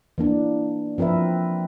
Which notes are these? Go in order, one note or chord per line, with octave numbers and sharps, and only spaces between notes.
E3 A#3 D4
F3 C4 A#4 B4 E5